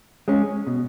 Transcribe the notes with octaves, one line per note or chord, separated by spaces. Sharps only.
G#3 C#4
B2